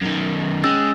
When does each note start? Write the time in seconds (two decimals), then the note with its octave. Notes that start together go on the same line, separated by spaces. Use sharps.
0.01 F#2 D#3
0.64 G#3 C#4 E6 A6